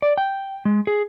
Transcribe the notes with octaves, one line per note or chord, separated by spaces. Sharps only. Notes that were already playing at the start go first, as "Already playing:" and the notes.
D5
G5
G#3
G#4